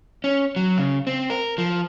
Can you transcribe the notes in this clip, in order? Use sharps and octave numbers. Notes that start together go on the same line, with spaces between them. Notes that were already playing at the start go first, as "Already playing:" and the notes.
C#4
F#3
C#3
C4
A#4
F3